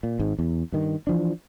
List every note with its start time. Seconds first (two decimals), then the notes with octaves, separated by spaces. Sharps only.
0.03 A#2
0.19 G#1 G#2
0.39 E2
0.72 G2 D#3
1.07 E3 F3 D4